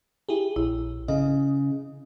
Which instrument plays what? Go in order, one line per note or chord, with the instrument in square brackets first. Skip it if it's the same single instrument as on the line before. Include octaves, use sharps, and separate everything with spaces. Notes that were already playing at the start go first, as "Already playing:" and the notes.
[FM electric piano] E4 G4 G#4
[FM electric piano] A#1 [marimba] E4
[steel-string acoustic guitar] C#3 [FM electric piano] D#5